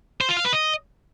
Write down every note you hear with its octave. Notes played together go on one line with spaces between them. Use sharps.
C5
F4
F5
B4
D#5